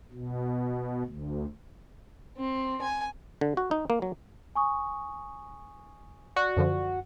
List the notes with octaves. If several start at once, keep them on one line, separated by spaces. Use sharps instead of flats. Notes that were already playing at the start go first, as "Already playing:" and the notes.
B2
D2
C4
G#5
D3
F#4
D#4
A#3
F#3
G#5 C#6 D#6
F#4 D5
F#2 D3 F3